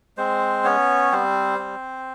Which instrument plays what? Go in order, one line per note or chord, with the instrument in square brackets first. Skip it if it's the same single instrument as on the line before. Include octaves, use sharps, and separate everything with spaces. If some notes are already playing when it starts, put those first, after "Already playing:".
[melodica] G#3 C4 C5
B3 C#4 C#5
G3 C4 C5
C4